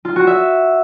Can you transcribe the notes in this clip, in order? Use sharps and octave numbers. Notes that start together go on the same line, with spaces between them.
F4
F#4
E5